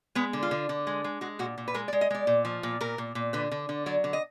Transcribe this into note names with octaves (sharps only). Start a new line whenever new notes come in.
G#3 B3
D3
F4
D3
D3
G#3
G#3
G#3 F#4
A#2 F#4
A#2
B4
G#3 A#4
D5
G#3
D#5
G#3 D5
A#2
F3
A#2
A#2 A#4
A#2
A#2
D3 B4
D3
D3
F#3 D5
D3
D#5